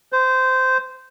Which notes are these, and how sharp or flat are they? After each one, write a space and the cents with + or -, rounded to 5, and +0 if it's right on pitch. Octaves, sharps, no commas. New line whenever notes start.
C5 -15